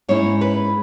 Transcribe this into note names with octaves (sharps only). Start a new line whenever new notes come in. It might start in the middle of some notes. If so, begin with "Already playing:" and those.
G#2 G#3 C#4 E4 C#5
B4